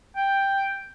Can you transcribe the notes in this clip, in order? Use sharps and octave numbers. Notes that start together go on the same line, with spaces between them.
G5